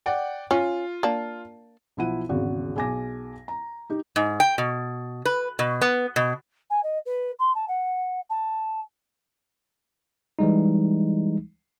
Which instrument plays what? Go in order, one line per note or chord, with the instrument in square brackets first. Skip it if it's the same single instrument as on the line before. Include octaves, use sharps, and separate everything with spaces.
[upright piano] D5 F#5 G5
[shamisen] C#4 [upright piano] F4
[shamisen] A#3 D4
[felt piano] B1 F3 E4 F#5 D#7
G#1 E2 C#3 F#4
B1 G#4 G#5 D6 A#6
A#5
D#4 G4
[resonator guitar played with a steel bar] G#2
G5
B2
B4
B2
B3
B2
[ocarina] G#5
D#5
B4
C6
A5
F#5
A5
[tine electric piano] E3 G3 G#3 D#4